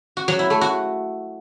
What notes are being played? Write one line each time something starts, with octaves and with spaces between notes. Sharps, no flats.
F#4
F#3
E4
A3
F#4